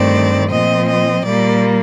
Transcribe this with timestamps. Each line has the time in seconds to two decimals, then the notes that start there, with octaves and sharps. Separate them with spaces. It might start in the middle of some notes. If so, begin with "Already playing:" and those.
Already playing: G2 D#3 A3 C4 D5
0.51 A#2 F3 C4 D#5
0.88 D#5
1.25 A#2 G3 A#3 D5